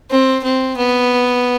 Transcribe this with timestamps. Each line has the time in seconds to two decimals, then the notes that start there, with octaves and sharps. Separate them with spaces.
0.11 C4
0.44 C4
0.77 B3